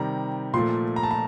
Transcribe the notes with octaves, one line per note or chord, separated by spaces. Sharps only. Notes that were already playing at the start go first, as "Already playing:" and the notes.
Already playing: C3 D#3 G3 A#5
A#2 F3 A3 C6
A#5
A5
A#5